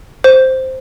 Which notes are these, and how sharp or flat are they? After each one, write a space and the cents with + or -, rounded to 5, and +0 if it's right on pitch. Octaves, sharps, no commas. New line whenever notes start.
C5 +0